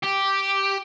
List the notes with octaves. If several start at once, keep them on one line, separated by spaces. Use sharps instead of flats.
G4